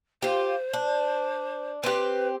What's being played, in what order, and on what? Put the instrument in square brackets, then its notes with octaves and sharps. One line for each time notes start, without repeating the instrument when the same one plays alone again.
[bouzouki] F4 G4 [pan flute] C5
[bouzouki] D4
[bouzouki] C4 G4 [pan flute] B4